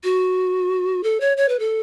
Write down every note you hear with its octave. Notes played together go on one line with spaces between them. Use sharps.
F#4
A4
C#5
C#5
B4
A4